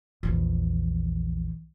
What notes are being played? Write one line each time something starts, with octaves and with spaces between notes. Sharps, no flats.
A#1 E2